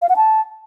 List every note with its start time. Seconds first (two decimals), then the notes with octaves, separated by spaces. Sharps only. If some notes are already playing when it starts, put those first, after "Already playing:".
0.02 F5
0.09 F#5
0.16 A5